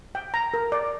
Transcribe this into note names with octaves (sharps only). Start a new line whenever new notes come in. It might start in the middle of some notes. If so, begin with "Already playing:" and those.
G5
A#5
A#4
D5